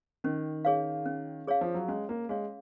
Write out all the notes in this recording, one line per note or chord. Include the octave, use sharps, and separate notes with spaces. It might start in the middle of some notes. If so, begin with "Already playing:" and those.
D#3 C#4
G#4 C#5 F5
C#4
G#4 C#5 F5
F3
F#3
G#3 C#4
A#3
G#3 G#4 C#5 F5